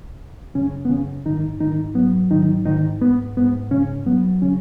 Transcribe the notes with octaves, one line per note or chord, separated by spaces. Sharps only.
C#2
F#2 C#3 C#4
B3
F#2 C#3 C#4
G#2 D#3 D#4
G#2 D#3 D#4
F#3 B3
G#2 D#3 D#4
G#2 D#3 D#4
G#2 B3
G#2 B3
G#2 C#3 C#4
F#3 B3
C#3 C#4